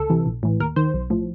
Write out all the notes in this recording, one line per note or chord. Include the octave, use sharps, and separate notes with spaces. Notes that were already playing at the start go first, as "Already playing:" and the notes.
Already playing: C#2 A4
C3 E3
A#1
A2 E3
D#2 A#4
D#3 C5
B1
A2 F3